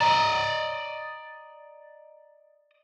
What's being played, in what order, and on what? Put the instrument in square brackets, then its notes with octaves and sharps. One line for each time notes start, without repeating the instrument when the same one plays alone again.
[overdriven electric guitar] D5 D#5 [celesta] A#5